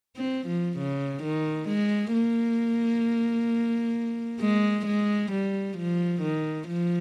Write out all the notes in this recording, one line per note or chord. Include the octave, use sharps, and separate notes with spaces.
C4
F3
C#3
D#3
G#3
A#3
G#3
G#3
G3
F3
D#3
F3